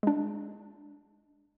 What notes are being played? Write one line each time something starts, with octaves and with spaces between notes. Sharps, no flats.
G#3 D4